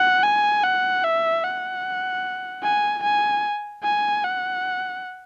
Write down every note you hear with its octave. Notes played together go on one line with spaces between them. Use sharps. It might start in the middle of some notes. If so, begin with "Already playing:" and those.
Already playing: F#5
G#5
F#5
E5
F#5
G#5
G#5
G#5
F#5